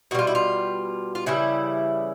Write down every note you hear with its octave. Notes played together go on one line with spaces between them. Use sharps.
B2 G3 F4 F#4
E4
F4
F4
C#3 E3 G3 E4